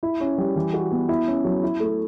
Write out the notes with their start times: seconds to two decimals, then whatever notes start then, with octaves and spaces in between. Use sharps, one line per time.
0.03 E4
0.20 C#4
0.38 G3
0.56 E3
0.74 F#4
0.92 B3
1.09 E4
1.27 C#4
1.44 F#3
1.63 E4
1.80 A3